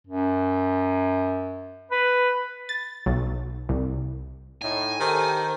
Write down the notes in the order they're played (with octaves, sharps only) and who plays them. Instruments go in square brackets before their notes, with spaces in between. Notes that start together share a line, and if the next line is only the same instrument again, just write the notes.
[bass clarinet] F#2
B4
[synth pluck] A6
B1
C2
[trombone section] A2 D#4 [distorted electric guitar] G#5
[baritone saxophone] D#3 [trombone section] G4 A4 [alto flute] C5